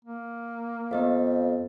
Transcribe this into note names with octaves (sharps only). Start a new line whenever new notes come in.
A#3
F2 B3 D#5 F5